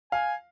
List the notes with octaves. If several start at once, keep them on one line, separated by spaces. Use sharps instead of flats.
F5 G#5